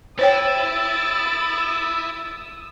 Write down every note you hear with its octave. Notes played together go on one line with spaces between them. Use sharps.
E4 C5 C#5 G5 D#6 E6 A6 D7